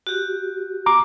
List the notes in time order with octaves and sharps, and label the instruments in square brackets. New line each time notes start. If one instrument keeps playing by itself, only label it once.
[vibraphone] F#4 G4
[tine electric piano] A#5 D6